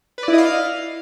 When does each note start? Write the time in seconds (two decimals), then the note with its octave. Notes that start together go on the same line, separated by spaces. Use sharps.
0.18 B4
0.23 D5
0.28 E4
0.33 D#5
0.38 F5